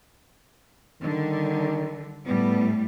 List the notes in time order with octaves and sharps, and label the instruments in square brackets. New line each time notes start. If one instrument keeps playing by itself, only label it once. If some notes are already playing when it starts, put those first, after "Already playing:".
[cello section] D3 G3 [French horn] D#3
[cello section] A2 G3 [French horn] B3